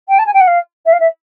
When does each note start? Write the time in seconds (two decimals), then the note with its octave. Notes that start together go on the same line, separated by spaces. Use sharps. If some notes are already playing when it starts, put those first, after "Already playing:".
0.08 G5
0.18 A5
0.26 G#5
0.33 G5
0.40 F#5
0.47 F5
0.85 E5
0.92 F5
1.00 E5